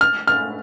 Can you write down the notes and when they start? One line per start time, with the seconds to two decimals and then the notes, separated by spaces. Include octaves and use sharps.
0.01 F6
0.27 F6